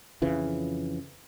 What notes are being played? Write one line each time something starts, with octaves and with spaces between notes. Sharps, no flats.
F2 C#3 E3 F3